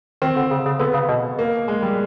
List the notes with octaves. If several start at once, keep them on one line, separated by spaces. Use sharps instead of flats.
D#3 C4
D3
C#3
C#3
D3 B3
C#3
B2
A#3
G#3
G3